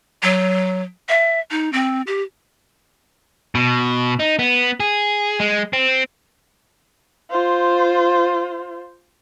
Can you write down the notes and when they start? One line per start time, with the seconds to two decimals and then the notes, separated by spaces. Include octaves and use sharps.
0.23 F#3
1.09 E5
1.51 D#4
1.73 C4
2.07 G4
3.55 B2
4.20 D#4
4.39 B3
4.80 G#4
5.40 G#3
5.73 C4
7.30 F4 C5